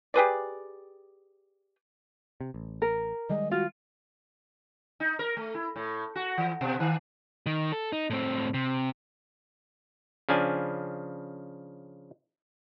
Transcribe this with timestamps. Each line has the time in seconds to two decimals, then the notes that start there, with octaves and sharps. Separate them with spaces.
0.14 G4 G#4 B4 D5
2.41 C3
2.54 A1
2.82 A#4
3.30 D#3 G3 G#3 D#5
3.51 F4 F#4
5.00 D#4
5.19 A#4
5.37 A3
5.55 E4
5.76 A2
6.15 F#4
6.38 E3
6.61 B2
6.80 D#3
7.46 D#3
7.72 A4
7.92 D#4
8.10 A2 C4
8.54 C3
10.29 C#3 F3 D4 G#5